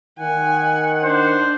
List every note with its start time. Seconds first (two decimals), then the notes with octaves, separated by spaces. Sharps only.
0.19 D#3 F#5 G#5
1.03 D4 C5